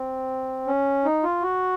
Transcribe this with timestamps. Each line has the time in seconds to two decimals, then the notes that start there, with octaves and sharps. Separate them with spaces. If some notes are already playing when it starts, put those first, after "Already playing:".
Already playing: C4
0.67 C#4
1.05 D#4
1.23 F4
1.42 F#4